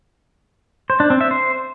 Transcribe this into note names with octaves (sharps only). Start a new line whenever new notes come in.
C5
D4
C4
E5
C5